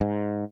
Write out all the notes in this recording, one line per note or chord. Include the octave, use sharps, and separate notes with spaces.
G#2